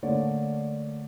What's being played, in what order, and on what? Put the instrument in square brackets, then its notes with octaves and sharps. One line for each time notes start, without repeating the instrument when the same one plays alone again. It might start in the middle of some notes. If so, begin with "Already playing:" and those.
[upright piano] D3 A3 A#3 C#5 D5